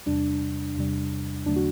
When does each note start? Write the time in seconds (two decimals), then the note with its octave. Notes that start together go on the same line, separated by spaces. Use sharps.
0.06 E2 C3 G3 D4
0.76 E2 C3 G3
1.46 E2 D3 F#3 A3 D4
1.56 F#4